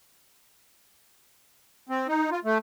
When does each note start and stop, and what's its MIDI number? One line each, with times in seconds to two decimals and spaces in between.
1.89 2.07 60
2.08 2.30 63
2.31 2.40 65
2.44 2.58 57